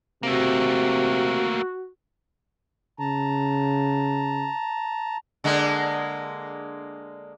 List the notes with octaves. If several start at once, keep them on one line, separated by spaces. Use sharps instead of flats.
C3 A3 A#3 F#4
C#3 A5 A#5
D3 G#3 A#3